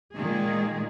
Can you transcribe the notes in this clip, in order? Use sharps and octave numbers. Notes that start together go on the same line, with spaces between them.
A#2 D#3 G#3 A#3 G#4